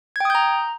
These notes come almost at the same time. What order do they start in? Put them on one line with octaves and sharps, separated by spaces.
G#6 G5 D#6 G6 A#5